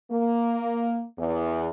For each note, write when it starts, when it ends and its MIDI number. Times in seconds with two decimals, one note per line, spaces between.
0.11 1.04 58
1.18 1.70 40